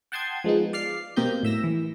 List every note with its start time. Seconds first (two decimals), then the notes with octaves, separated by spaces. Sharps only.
0.12 F#5 G5 A5 C6 D#6 G#6
0.44 F3 G#3 B3 D#4
0.73 D5 F5 F6 C7
1.16 B2 A#3 C4 G4 D#5 G6
1.43 A2 E5 E6 A#6
1.64 E3